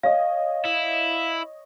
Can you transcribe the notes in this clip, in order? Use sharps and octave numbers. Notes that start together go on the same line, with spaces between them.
C#5 D#5 F5
E4